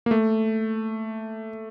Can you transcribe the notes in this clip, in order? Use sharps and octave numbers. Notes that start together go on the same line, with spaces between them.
A#3
A3